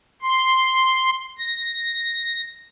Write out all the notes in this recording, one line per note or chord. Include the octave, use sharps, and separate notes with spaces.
C6
A#6